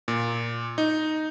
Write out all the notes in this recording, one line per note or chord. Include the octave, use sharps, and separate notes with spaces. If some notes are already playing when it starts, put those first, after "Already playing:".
A#2
D#4